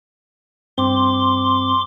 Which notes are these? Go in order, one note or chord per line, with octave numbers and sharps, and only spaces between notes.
G2 C4 C6 D6